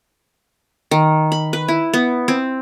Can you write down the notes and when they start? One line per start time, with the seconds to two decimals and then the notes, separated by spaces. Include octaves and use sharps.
0.91 D#3
1.32 B5
1.53 B4
1.68 E4
1.93 B3
2.28 C4